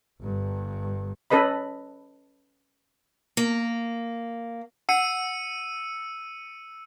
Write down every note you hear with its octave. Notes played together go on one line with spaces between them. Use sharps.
G1 G2
C#4 A4 B4 D#5 B5
A#3
F#5 E6 C#7 D#7